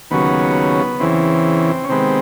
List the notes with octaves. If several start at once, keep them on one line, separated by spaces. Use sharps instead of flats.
D#2 C#3 F#3 B3
E2 C#3 E3 C4
C#4
C3 D#3 G#3 B3 C4